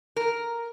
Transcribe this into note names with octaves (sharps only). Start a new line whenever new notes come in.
A#4